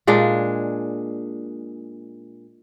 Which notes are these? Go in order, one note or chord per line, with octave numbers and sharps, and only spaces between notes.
A#2 G#3 D4